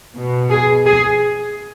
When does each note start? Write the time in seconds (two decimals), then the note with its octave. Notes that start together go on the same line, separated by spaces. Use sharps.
0.15 B2
0.50 G#4
0.86 G#4